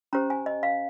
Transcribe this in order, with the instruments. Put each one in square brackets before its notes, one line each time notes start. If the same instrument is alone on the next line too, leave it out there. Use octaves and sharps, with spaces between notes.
[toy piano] C#4 G4 C5 A#5
G#5
D#5
F5